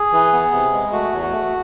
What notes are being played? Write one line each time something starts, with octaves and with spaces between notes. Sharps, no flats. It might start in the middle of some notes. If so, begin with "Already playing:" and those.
Already playing: G#4
E3
B3
C3
G#3
A3 F#4
E2
F#4
A3